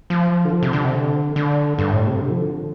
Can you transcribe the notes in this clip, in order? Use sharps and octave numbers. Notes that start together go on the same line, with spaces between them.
F3
D3
F3
C3
D3
C3
D3
D3
G2
A2
C3
D3
F3
D3